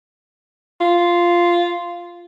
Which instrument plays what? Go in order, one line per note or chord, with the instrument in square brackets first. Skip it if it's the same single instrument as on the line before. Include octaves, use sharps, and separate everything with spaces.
[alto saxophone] F4